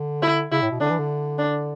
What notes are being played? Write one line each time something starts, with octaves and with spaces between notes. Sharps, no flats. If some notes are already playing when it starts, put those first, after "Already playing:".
Already playing: D3
E4
C#3 E4
A2
B2
D3 D4
E3
D3
D4